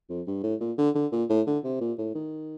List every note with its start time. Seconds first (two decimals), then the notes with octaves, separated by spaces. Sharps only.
0.10 F2
0.27 G2
0.43 A2
0.61 A#2
0.78 D3
0.95 D3
1.13 A#2
1.30 A2
1.47 D3
1.64 C3
1.81 A#2
1.98 A2
2.15 D#3